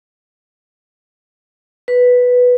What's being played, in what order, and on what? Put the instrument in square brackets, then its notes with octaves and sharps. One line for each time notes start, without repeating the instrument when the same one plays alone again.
[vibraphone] B4